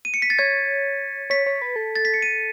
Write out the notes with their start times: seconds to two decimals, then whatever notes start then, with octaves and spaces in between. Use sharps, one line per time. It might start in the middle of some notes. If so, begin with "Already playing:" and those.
0.05 D#7
0.14 C#7
0.22 B6
0.30 A6
0.39 C#5 G#6
1.30 C#5 B6
1.46 C#5
1.62 B4
1.76 A4
1.95 A6
2.05 B6
2.14 C#7
2.22 D#7